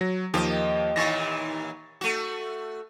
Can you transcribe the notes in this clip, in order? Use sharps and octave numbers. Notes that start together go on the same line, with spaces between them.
F#3 A#6
D#2 F3 A#3 G4 D#5
D#2 A#2 E3 C#6 A6 A#6
A3 F#4